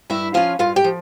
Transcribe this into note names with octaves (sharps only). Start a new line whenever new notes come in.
G2 E4 E5
F3 C#4 F4 F5
G2 F4 F5
G4 G5
F3